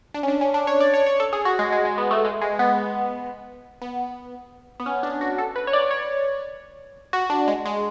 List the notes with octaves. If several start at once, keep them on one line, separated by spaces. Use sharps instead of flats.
D4
C#4
D4
C#4
D4
C#5
D5
C#5
C#5
A4
G#4
F#4
G#3
G#3
G#3
B3
A3
G#3
G#3
B3
B3
B3
C#4
D4
F#4
A4
B4
C#5
D5
C#5
F#4
D4
G#3
G#3